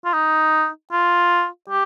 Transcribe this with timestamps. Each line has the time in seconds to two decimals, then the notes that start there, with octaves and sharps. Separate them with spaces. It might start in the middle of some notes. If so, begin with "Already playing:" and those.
0.05 F4
0.13 D#4
0.92 F4
1.70 G4